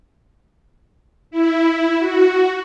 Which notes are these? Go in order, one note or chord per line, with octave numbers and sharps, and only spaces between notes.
E4
F#4